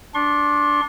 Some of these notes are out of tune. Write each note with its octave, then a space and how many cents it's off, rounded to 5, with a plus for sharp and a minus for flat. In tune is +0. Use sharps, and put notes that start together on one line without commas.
D4 -10 C6 +35